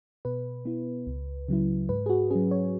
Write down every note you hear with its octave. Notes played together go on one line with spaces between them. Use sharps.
B2 B4
B3 E4
C#2
C#3 F#3 E4
G#2 B4
G#4
F#4
F#3 C#4 G#4
C#5